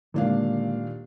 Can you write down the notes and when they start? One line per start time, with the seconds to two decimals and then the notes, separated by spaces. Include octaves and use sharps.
0.14 D#1 D3 G#3 A#3 D4 F5